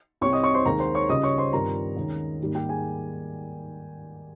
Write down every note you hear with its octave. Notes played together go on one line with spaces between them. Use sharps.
C2 C3 G3 C4 C#5 C#6
D#5 D#6
C#5 C#6
C5 C6
D#2 D#3 G#3 A#4 A#5
C5 C6
C#5 C#6
C#2 C#3 G3 D#5 D#6
C#5 C#6
C5 C6
G2 D#3 G3 C4 F4 A#4 A#5
D#2 D#3 G#3 C#4
G#2 D#3 G3 A#3
G4 G5
G#4 G#5